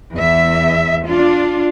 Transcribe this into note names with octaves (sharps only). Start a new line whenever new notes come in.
E2 E5
D4 F4